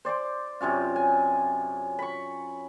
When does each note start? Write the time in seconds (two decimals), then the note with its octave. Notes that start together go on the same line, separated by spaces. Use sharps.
0.05 C5 D5 C6 D6
0.61 F#2 C3 C#4 F4
0.96 G#5
1.99 B5 C#6